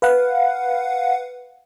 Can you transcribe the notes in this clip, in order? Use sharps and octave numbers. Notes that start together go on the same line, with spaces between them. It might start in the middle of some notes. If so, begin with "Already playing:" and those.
B4 F5 F#5